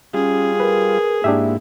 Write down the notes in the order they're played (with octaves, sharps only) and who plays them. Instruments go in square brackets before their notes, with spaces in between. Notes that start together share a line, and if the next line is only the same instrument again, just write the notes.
[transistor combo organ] G3 F4 [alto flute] C#4 [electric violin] G#4
[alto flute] A#4 [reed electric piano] B4
[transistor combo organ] G#2 E4 [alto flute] A#3 [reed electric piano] D4 G4 E5